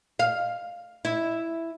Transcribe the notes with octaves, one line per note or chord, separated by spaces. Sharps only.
F5
E4